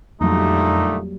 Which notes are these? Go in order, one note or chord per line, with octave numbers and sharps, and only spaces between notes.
F2 A#2 D3 F#3 G3 A3 A#3 D#4